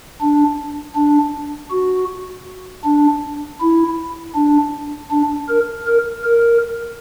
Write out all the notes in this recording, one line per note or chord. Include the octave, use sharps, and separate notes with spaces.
D4
D4
F#4
D4
E4
D4
D4
A#4
A#4
A#4